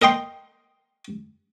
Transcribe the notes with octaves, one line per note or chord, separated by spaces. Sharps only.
A#4 D#5 G5 C6